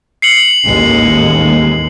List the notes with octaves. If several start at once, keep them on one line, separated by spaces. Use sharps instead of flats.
C7 C#7 F#7
A1 D#2 G#3